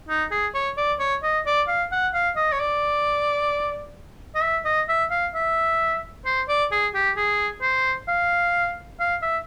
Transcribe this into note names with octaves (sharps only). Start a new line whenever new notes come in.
D#4
G#4
C#5
D5
C#5
D#5
D5
F5
F#5
F5
D#5
C#5
D5
D#5
E5
D#5
E5
F5
E5
C5
D5
G#4
G4
G#4
C5
F5
F5
E5